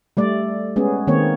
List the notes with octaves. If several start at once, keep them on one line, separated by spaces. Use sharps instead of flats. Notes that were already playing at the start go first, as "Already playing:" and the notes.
G3 A3 D5
G#3 B3 C#4 G#4
D#3 A#3 C4 C#5